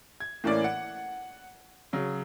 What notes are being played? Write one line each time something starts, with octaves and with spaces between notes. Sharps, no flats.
G#6
A2 E3 A#3 C#4 D5
F#5
C#3 F#3